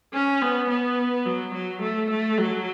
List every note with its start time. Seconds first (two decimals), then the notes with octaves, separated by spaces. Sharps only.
0.14 C#4
0.42 B3
0.70 B3
1.26 F#3
1.54 F#3
1.82 A3
2.10 A3
2.38 F#3